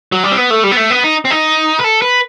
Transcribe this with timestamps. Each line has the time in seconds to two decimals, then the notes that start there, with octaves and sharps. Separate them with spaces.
0.12 F#3
0.23 G3
0.32 C4
0.37 B3
0.50 A3
0.64 G3
0.71 B3
0.77 A3
0.90 B3
1.04 D#4
1.25 C4
1.31 D#4
1.79 B4
1.84 A4
2.02 B4